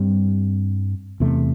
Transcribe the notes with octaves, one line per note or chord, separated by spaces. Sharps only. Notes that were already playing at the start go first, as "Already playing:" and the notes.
Already playing: G2 G3 C4
E2 C3 A3